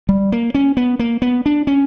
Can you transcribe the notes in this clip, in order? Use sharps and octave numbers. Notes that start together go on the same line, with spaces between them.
G3
A#3
C#4
B3
A#3
B3
D4
C#4